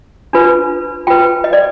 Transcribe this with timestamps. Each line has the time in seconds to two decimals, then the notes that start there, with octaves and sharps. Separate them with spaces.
0.33 D4 F4 B4
1.07 F4 B4 G5
1.44 D#5
1.53 D5